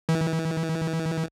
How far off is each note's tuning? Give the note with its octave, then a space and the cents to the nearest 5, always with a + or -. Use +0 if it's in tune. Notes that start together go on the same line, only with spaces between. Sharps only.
E3 -30